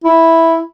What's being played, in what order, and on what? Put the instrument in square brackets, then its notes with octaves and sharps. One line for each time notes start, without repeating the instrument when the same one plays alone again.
[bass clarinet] E4